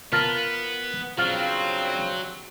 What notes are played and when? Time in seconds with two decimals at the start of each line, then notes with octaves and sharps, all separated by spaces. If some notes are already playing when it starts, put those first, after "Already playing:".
0.12 B3 F4 A#4 A5
1.18 G2 C#3 F#3 C4 F4 F5